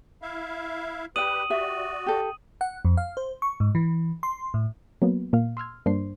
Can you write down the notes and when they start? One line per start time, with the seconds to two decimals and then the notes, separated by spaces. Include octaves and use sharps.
0.22 E4 E5 F5
1.16 G4 B4 D5 G5 D#6 D#7 F#7
1.50 F#4 G4 D5 E5
2.06 G4 A4
2.61 F#5
2.85 F2
2.97 F5
3.17 C5
3.42 C#6
3.60 G#2
3.75 E3
4.23 C6
4.54 A2
5.02 F#3 A#3 B3
5.33 A#2 A#3 F5
5.57 C6 E6 F6 G#6
5.86 G2 A#3 D4 C5 C6 C7